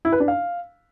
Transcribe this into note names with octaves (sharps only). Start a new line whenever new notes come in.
E4
B4
D4
F5